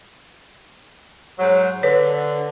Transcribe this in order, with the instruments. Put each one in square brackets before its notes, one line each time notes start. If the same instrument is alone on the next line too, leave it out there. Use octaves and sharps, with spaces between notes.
[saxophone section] G#2 F#3
[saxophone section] D3 [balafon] B4 C#5